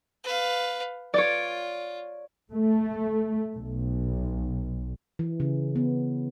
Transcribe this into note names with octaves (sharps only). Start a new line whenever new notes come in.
B4 F5
F4 C#5 D5
A3
B1
E3
C#3
B3